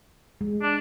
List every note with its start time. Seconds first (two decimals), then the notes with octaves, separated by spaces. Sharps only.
0.41 G#3
0.62 D4